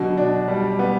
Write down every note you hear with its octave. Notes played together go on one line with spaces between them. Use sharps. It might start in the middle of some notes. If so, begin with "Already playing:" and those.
Already playing: B2 D3 F#3
D4
G3
B3